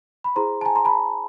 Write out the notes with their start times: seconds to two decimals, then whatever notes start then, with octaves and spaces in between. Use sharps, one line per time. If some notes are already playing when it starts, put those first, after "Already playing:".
0.24 B5
0.36 E4 G#4 C5 A#5 C6
0.61 A5
0.65 G#5 A#5
0.75 A#5 C6
0.85 A5 B5